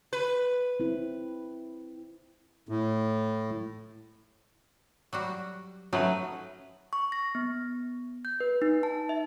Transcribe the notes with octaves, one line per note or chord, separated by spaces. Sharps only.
B4
C4 E4
A2
F#3 G3 F#4
F#3 A3 C#4 D#4 B4
C#6
A#6
B3
G6
B4
D#4
A5
E5